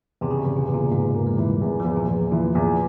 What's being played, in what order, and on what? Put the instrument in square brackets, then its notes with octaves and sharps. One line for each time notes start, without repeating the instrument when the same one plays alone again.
[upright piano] E2 [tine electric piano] C3
[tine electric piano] C#3
C3
[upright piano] E2
[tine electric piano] A#2
[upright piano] E2
[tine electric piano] A#2
[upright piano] E2 [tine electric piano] G#2
[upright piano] A#3
[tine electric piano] G#3
[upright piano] E3
[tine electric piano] G3
[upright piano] E2
[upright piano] E2 [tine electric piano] F3
[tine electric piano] A#2
[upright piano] E2
[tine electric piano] A#2 [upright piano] E3
[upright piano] E2